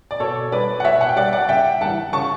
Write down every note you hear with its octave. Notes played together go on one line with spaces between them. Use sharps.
D5
B2 A4 C#5
G3 B4 D5
F#5
B2 C#5 E5
F#5 A5
G5
G3 D5 F#5
D5 F#5
C#3 E5 G5
E3 G3 F#5 A5
C#3 A5 C#6